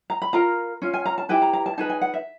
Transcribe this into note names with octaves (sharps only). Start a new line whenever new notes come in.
A#5
B5
F4 A#4 A#5
C#4 F4
G#5
A#5
A5
E4 G4 B4 G#5
A#5
A#5
A5
D#4 G#4 B4 A5
G#5
F#5
E5